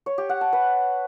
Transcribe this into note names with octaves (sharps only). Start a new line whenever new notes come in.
C#5
G4
F#5
A5
B4